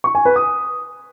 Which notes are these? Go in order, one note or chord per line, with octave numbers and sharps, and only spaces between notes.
C#6
G#5
B4
D#6